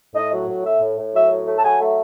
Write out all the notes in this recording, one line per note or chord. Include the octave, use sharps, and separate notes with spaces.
A2 D#5
F#3
A2
A3 E5
A2
A2
F#3 E5
A2
A3
A5
F#3 G#5
A3